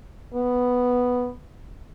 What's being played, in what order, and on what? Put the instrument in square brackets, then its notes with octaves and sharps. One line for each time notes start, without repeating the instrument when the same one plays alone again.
[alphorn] B3